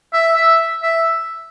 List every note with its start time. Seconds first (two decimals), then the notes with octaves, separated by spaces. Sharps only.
0.13 E5
0.36 E5
0.83 E5